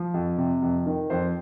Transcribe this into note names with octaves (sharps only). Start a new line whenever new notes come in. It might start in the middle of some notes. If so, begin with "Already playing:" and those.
Already playing: F3
F2
C3
F2
D#3
F2 C5